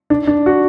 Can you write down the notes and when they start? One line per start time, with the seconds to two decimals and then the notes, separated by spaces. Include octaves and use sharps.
0.10 D4
0.27 D4
0.46 F#4